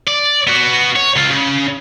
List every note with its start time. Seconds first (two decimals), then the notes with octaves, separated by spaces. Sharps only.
0.07 D5
0.47 B3 F#4
0.96 C#5
1.16 C#2 F4
1.30 C#3